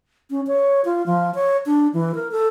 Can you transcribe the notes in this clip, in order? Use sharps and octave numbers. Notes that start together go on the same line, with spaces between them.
C#4
C#5
F4
F3
C#5
D4
E3
A#4
A4